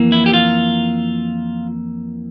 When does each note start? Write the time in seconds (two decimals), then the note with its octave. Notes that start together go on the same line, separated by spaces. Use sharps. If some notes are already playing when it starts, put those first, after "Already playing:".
Already playing: F2 E3 A#3
0.12 E4
0.26 G4
0.33 F4